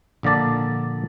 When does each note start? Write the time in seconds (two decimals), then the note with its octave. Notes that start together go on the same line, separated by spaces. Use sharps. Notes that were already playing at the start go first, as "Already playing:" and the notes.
0.23 A#1 D3 A#3 D5 A5